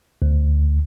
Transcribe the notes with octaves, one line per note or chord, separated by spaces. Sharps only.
D2